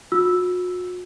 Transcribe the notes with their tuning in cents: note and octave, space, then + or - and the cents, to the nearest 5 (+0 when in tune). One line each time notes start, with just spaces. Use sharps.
F#4 -45 E6 +0